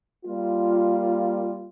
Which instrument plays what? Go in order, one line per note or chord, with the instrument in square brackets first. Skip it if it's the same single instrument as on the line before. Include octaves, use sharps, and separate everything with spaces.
[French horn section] G3 A#3 F4